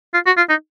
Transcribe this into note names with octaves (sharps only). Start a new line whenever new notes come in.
F4
F#4
F4
D#4